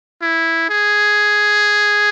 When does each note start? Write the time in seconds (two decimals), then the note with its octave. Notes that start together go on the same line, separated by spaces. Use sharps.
0.22 E4
0.70 G#4